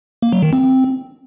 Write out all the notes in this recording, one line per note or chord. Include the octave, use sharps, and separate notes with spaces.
A#3
F#3
D#3
C4